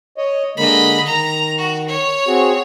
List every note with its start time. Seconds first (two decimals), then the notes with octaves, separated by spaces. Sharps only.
0.18 C#5 D#5
0.57 D3 G#3 A#3 D#5 B5
1.06 D#3 A#5
1.58 F#4
1.88 C#5
2.27 C4 F#4 G#4